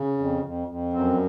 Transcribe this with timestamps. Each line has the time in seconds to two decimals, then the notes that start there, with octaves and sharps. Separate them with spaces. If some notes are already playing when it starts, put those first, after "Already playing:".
Already playing: C#3
0.18 F2
0.43 F2
0.67 F2
0.93 F#2 C4